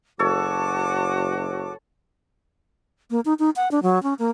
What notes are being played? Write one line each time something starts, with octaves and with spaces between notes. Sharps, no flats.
F#1 F#4 A4 C#5 A5 D6
A#3
D#4
D#4
F#5
D4
F#3
C#4
A#3